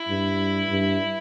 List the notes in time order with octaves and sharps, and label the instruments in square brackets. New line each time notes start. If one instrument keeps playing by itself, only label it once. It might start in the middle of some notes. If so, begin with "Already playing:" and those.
Already playing: [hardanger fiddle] E4
[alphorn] G2
G2